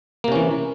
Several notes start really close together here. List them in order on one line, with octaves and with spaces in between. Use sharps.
A#3 C3 C#4 E3